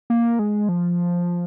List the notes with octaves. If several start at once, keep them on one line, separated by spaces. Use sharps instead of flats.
A#3
G#3
F3